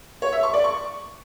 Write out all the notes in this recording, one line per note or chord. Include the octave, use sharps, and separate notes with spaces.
C#5
E5
C#6
D5
C#6